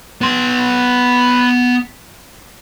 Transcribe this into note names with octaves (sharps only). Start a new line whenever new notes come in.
B3 C6